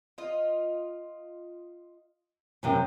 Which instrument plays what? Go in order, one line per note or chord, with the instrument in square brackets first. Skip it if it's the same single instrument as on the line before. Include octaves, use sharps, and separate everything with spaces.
[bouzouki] F4 D#5
[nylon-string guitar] F#2 C3 E3 [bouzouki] C4